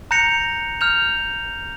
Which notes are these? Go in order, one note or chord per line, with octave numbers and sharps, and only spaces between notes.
A#5 F#6 G6 A#6 C#7 F7
F6 G6 F7